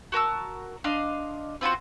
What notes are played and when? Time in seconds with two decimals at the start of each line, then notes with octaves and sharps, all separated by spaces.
0.12 F#4 A#4 A5 E6
0.84 D4 D#5 F5 C6
1.61 C4 F4 F#4 C5